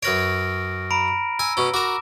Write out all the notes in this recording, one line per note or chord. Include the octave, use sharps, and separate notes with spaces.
F#2 B4 C#5 F6 A#6 D7
A#5 B5 D7
G#5 E6
B2 C#4
F#4 A#4 D6 E7